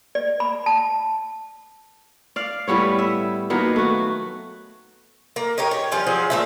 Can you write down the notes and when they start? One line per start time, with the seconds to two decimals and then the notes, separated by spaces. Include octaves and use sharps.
0.15 D5
0.40 B5
0.66 A5
2.36 D5 F5
2.68 A2 G3 B3 C#5
2.99 E5
3.50 D#3 F#3 A#3 B3
3.76 A3 F#4
5.36 A#3
5.58 G4 A#4 C#5 D#5
5.71 C#5
5.92 F3 G3 C#4 F4
6.06 F3 F#3 G#4 C5
6.30 A#2 A3 E5